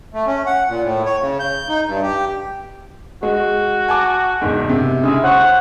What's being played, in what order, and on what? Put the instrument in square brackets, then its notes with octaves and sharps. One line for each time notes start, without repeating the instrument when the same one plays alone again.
[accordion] A3
C#4
F#5
A#2
A2
C#5
C#3
G6
D#4
G2
G4
[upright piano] G#3 [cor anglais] F#4
[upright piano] G#5 A5 D6
F#1 E2 G#2
C3
[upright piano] C#3 E4 [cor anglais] G#3
[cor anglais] C5 [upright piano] C#5 C#6 [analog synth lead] F#5